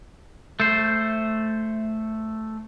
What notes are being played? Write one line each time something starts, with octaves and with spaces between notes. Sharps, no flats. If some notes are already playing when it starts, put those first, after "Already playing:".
A3 C5